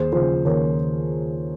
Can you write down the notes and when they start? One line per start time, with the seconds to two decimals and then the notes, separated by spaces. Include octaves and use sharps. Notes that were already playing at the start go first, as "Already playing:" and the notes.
Already playing: D#2 G#4 C5
0.12 C#3 F3 G#4 C5
0.45 D#2 A#4 C#5